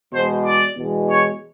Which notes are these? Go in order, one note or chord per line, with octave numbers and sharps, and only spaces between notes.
E2 B2 G#3 C5
D5
E2 B2 G#3
C#5